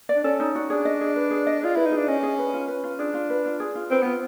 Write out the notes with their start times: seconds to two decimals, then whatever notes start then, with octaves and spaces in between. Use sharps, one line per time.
0.09 D5
0.16 D4
0.24 C#4 A4
0.40 D#4
0.55 F#4
0.70 D4 G#4
0.85 D#5
1.01 G#4
1.16 B4
1.31 G#4
1.47 D#5
1.62 F4 G#4
1.75 E4 B4
1.86 D#4
1.92 G#4
1.97 D4
2.08 C#4 D#5
2.23 G#4
2.39 B4
2.54 F4
2.68 B4
2.84 F4
2.99 D4 G#4
3.14 F4
3.30 B4
3.46 F4
3.60 G#4
3.75 F4
3.91 C4 B4
4.03 B3 F4